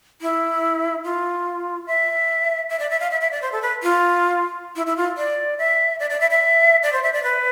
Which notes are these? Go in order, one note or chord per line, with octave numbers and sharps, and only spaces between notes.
E4
F4
E5
E5
D5
E5
F5
E5
E5
D5
C5
A4
B4
F4
E4
E4
F4
D5
E5
D5
D5
E5
E5
D5
C5
E5
D5
B4